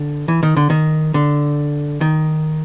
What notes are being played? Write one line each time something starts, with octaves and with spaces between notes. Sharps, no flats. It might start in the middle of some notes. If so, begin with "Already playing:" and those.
Already playing: D3
E3
D#3
D3
D#3
D3
D#3